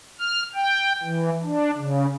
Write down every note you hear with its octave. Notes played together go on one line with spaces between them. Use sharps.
F6
G5
E3
D4
C#3